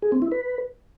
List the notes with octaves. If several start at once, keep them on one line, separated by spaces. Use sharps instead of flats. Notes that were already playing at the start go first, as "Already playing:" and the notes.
G#4
C4
E4
B4